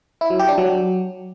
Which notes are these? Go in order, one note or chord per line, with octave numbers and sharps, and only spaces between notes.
E4
F#3
G4
D4
F#3